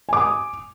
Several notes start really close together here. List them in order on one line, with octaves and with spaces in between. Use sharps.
G#5 D6 D#6